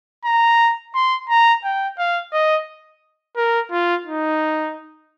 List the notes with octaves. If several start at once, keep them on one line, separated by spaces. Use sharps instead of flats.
A#5
C6
A#5
G5
F5
D#5
A#4
F4
D#4